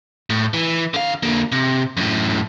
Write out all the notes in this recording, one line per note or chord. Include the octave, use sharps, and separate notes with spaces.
A2
E3
D3 F5
D3 A#3
C3
F#2 A2